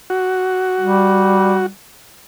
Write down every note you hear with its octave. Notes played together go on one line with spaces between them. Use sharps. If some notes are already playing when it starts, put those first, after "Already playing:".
F#4
G3